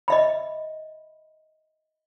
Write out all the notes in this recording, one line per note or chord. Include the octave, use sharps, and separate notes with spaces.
D#5 E5 B5